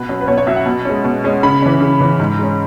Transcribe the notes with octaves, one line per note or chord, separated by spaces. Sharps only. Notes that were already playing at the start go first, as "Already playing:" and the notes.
Already playing: B2 B4
F#3 C#4
B4
B2 C#5
C#5
F#3 C#4 E5
F#5
B2
G#3 C#4
B2
G#3 C#4
C#3 B5
E3 C#4
C#3
E3 C#4
G#2
G#3 C#4